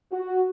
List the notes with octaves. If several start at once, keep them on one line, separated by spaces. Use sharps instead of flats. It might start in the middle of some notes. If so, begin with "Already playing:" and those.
F#4